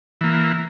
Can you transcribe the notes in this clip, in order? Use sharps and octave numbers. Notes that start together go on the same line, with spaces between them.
E3 A#3